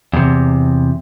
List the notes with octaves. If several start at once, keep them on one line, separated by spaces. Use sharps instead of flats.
E2 C3